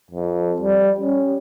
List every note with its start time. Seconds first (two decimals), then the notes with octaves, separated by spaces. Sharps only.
0.11 F2
0.60 G3
1.00 C#4